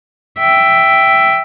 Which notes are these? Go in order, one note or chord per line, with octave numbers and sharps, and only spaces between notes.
E5 G5